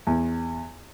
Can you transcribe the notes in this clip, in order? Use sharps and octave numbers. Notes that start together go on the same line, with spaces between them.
E2